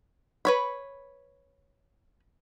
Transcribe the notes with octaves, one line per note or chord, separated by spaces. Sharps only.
B4 C#5 B5